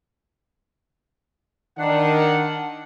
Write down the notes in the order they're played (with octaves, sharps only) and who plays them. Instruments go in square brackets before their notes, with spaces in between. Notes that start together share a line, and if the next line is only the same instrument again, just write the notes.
[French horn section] D#3 [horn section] D4 F#5